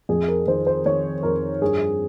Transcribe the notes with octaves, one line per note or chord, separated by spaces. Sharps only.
F2 G#4
A#4
D#3 C5
C5
D#3 C#5
F2 A#4
G2 G#4